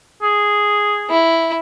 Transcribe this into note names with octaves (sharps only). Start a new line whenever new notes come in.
G#4
E4